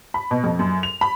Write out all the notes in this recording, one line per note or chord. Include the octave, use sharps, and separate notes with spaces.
B5
B2
F2
F#2
F7
B5